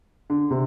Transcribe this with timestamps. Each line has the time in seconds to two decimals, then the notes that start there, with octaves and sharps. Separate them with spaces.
0.30 D3
0.51 C3